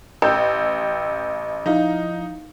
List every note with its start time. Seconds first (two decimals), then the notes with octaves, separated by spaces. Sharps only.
0.22 A1 G5 E6 G6
1.66 F3 D#4 E4 F5